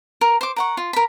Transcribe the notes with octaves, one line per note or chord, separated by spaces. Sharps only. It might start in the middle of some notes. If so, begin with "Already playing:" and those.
A#4
C5 D6
A#4 F#5 C#6
F4
A#4 B5